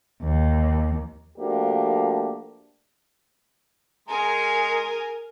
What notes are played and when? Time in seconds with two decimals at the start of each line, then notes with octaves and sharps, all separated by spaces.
0.21 D#2
1.37 F3 A3 A#3 D4 F#4 G4
4.08 G#3 G#4 A#4 G#5 A#5 C6